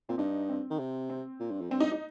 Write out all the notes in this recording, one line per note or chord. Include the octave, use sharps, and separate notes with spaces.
A#2 C4
G2 D#4
C4
D#3
C3
C4
A#2
G2
F2
G2 C4
D#4
D#4